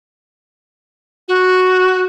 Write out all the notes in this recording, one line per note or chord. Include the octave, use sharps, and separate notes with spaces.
F#4